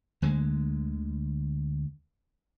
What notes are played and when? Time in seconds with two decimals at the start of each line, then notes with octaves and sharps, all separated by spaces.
0.22 D2 D3 G#3